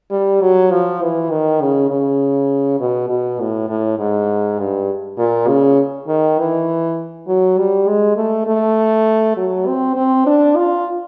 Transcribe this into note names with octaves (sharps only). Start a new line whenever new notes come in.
G3
F#3
F3
E3
D#3
C#3
C#3
B2
B2
A2
A2
G#2
G2
A#2
C#3
D#3
E3
F#3
G3
G#3
A3
A3
F#3
C4
C4
D4
F4